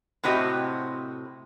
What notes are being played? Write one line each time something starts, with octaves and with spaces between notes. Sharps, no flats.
A2 C3 C4 F#4 G4 D#5